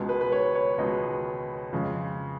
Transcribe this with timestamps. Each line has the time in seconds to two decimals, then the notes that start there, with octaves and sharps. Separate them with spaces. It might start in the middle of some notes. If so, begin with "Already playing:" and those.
Already playing: C#2 B2 G#3
0.09 B4
0.21 B4
0.32 C#5
0.55 C#5
0.78 C#2 B2 G#3 D#5
1.72 F2 C#3 G#3